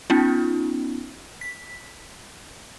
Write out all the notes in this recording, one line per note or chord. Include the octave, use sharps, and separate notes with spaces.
B3 C#4 D#4 F4
B6